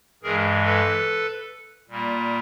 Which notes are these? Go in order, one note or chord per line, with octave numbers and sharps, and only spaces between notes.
G2 E3 G#3 G#4 A#4
A4 B4
A#2 G3 A#3